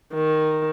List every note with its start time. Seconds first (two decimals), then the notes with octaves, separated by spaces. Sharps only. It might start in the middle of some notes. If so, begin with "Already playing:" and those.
0.14 D#3